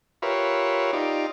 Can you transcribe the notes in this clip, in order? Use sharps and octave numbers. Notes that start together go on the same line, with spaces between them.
F4 G4 A#4 B4 C#5 E5
D#4 F4 G4 D5